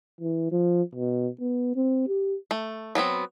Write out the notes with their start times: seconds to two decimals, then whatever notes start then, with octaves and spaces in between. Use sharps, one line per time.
0.21 E3
0.52 F3
0.95 B2
1.41 B3
1.76 C4
2.08 G4
2.51 A3
2.95 F#3 G3 B3 C4